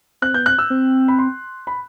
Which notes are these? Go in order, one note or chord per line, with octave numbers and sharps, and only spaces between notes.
C4 F#6
B3 G6
C4 F#6
E6
C4
B5
C6
B5